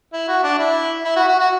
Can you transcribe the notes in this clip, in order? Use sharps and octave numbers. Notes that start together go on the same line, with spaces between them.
E4
F#4
D4
E4
E4
F#4
F#4
F#4